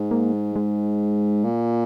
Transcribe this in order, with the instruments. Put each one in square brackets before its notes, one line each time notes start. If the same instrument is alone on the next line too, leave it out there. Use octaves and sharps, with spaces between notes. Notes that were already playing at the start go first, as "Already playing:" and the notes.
Already playing: [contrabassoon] G#2
[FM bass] A#3
G#3
G#3
[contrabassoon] A#2